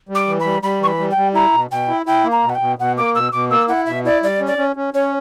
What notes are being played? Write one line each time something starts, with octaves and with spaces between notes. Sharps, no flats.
G3
D6
E3
B5
G3
G3 B5
E3 C#6
B5
G3
G5
G3
E4 A#5
B2
B2 G5
E4
E4 G5
A#3
A#5
B2
F#5
G5
B2
B2 F#5
A#3 D6
B2 E6
B2 D6
A#3 E6
E4 F#5
B2 E5
E4 D5
G3 D5
C#4
D5
C#4
C#4
C#4 C#5